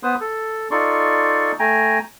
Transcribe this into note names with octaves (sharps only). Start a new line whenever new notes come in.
B3 B4 C5 C6 D#6
A4
D#4 F4 A4 D5 C6 C#6
A3 G5 G#5 A#5